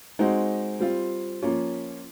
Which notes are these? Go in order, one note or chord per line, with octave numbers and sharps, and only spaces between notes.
G#3 C4 D#4 F#4
G3 C4 F4
F3 A#3 C#4 F4